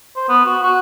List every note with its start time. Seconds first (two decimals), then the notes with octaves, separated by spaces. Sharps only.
0.16 C5
0.29 B3
0.46 F#4
0.63 F#4